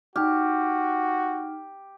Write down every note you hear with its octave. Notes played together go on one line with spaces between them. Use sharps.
D#4 F#4 G4 F6